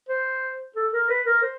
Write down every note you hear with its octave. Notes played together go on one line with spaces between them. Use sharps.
C5
A4
A#4
B4
A#4
C5